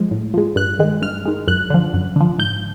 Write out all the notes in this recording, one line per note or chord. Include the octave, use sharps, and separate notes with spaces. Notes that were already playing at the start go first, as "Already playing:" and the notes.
Already playing: F3 G#3
A2
F3 G#3
G2 F#6
D#3 G#3
G2 F6
D#3 G#3
F#2 F#6
D3 F3
F#2
D3 F3
G#2 G6